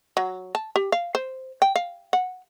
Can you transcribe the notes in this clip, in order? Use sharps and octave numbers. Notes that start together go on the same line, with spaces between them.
F#3
A5
G4
F5
C5
G5
F5
F#5